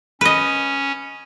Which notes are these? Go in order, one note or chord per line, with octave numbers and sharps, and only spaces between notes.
C#4 B4 D#5